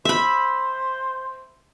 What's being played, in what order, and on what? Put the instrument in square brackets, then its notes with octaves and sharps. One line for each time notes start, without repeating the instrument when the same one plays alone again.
[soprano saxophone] C5 [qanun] E5 B5